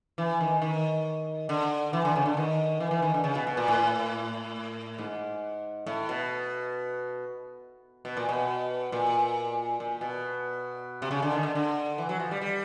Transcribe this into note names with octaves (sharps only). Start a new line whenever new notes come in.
E3
D#3
D#3
D3
E3
D3
C#3
D3
D#3
E3
E3
D#3
D3
C#3
B2
B2
A#2
A2
G#2
A2
B2
B2
A#2
B2
A#2
A#2
B2
C3
C#3
D3
D#3
D3
D3
E3
F#3
F3
G3
G3